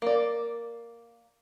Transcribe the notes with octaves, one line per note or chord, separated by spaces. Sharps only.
A#3 D5